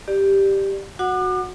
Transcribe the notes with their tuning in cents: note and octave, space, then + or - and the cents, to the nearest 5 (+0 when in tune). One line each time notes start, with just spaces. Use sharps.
G4 +0 D5 +20
F#4 -10 F#5 -5 D6 +40